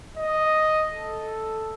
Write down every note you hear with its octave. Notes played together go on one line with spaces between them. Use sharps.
D#5
A4